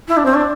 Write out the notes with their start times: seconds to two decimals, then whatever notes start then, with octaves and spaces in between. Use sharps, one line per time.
0.08 E4
0.17 D4
0.25 C4
0.34 D4